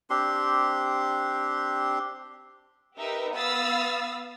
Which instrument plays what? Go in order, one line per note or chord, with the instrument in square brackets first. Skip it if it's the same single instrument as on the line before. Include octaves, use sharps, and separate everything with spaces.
[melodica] C4 D4 G4 C6
[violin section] D#4 G4 A#4 B4 E5
B3 F5 B5 D#6 E6 A6